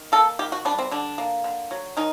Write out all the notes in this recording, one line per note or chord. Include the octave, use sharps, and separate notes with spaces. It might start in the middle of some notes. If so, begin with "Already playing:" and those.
Already playing: D#3
A#3 A4
D#3 G4
F#4
G3 D4
C4
D3 D4
A#3
D3
F#3
D#3 D#4